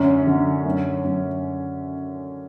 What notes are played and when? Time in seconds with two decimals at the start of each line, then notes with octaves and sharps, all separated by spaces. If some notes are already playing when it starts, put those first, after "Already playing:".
Already playing: F#2 D3 C#4
0.27 D3
0.66 F#2
1.04 F#2